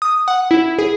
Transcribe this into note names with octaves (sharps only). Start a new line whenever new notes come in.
D#6
F#5
E4
G#4